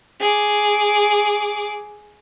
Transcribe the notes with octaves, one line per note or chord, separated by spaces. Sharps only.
G#4 D6